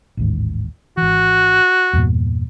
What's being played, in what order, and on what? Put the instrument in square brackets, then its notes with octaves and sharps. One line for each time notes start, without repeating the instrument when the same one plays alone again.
[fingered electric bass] A1 D#2 G#2
[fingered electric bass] G#1 E3 [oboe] F#4
[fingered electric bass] E2 G2 A#2